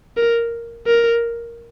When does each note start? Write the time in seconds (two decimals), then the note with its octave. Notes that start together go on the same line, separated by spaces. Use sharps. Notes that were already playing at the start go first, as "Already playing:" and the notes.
0.17 A#4
0.87 A#4